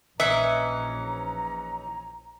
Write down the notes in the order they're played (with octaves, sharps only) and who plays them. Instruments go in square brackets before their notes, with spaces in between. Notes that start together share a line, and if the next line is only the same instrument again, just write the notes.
[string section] A#1 [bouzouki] E3 C#4 D#4 [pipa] E5 [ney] A#5